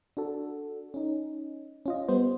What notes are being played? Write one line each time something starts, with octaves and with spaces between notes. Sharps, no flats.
D4 F#4 A4
C#4 D#4
C#4 F4 D#5
G3 B3 C5